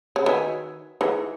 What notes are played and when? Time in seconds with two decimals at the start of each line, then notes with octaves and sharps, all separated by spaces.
0.16 C#3
0.26 D#3 F#4 B4 E5 G#5
1.01 E3 D#4 G#4 B4